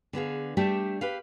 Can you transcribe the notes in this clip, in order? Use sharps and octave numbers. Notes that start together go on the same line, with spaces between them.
D3 B3 G#4 F5
G3 A3 D4 G4 E5
G4 B4 F5